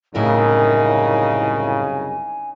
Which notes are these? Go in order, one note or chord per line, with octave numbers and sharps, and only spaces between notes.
C2 F#2 A2 C#3 D#4 E4 A#4 G#5